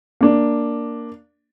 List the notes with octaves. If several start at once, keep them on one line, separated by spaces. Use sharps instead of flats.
A#3 D4